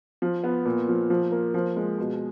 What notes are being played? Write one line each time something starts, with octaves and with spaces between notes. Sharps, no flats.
F3
B3
A#2
F3
F3
A#3
F3
G#3
B2